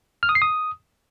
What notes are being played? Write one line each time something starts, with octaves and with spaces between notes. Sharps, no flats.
F6
D#6
C7
D#6